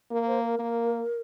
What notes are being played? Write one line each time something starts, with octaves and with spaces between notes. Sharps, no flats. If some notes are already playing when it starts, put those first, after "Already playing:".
A#3 A#4
C5
A#4
A#3